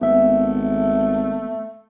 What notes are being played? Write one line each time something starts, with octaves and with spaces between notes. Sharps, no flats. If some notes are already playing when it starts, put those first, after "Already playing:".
G#1 A3 B3 E5